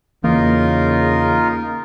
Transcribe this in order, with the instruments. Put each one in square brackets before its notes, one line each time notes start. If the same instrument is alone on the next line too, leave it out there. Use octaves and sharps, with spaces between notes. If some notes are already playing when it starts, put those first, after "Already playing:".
[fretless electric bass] E2 E3 [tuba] C#3 [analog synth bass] A#3 [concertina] D#4 F4 A#4